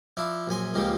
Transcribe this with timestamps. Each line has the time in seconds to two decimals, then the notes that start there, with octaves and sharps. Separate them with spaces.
0.17 F3 D4 E4
0.47 A#1 F#2 G#5 C6
0.74 C#2 A#2 D#3 F3 G3